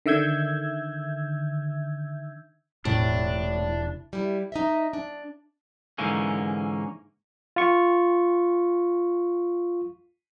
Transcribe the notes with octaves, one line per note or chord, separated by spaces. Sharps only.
D3 D#3 E5 E6 G6 G#6
E1 A2 C3 C4 D4
G3 E4
D#4 D#5 E5
D4
G#2 D3 E3 A#3 C#4
F4 C#6